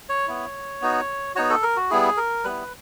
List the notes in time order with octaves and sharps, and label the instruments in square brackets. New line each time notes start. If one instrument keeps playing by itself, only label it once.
[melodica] C#5
B3 E4
B3 D#4 F#4
B3 D#4 F#4 C#5
A4
A#4
F#4
G3 B3 E4 G#4
A#4
G3 B3 E4 B4